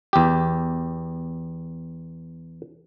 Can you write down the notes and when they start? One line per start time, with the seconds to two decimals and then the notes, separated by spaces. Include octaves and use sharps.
0.13 E2 G4